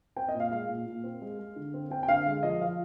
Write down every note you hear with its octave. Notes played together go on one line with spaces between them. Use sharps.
C4 G5
D#5
A#2
F5
G#3 F5
A#2
A#2
C4
G#3
G#3
D3
C4
C4 G5
G5
D3 F5
G#3 F5
F3 D#5
F3 F5